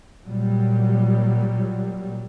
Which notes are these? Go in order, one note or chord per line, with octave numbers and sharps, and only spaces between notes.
A#2 F#3 G3